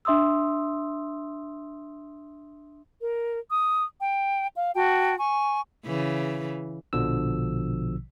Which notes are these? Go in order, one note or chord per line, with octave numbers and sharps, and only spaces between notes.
D4 E5 C6 D#6 E6
A#4
D#6
G5
F5
F#4 G5 A5
G#5 C#6
C#3 E3
A#1 B2 D3 F3 E6